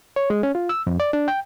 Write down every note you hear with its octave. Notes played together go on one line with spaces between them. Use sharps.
C#5
G#3
C#4
F4
E6
F2
D5
D4
G5